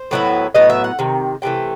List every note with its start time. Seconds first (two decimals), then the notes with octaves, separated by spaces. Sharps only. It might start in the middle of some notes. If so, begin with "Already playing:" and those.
Already playing: C5
0.11 A2 F#3 B3 E4
0.55 A2 F#3 B3 D#5
0.70 E5
0.84 F#5
0.99 C3 D#3
1.42 C3 E3 A3 G5